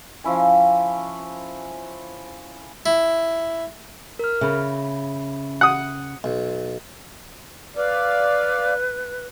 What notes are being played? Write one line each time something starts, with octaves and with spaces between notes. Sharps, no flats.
F3 C#4 E4 G#5
E4
A#4 F6
C#3 E5 B5
F#5 D#6
B1
B4 D5 F5